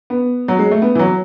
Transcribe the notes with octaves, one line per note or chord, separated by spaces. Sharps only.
B3
F#3
G#3
A3
B3
E3
F#3